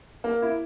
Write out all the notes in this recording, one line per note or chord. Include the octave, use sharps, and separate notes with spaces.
A#3
E4